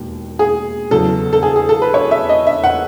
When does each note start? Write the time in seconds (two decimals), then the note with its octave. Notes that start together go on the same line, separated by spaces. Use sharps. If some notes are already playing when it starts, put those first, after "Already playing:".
Already playing: E1 D#2
0.39 G#4
0.91 E2 C#3 F#3 A4
1.33 A4
1.43 G#4
1.56 G#4
1.69 A4
1.82 B4
1.94 C#5
2.11 E5
2.29 D#5
2.47 E5
2.64 F#5